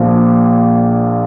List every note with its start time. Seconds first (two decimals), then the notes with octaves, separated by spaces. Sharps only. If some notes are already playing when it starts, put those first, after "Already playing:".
Already playing: A#1 A#2 F3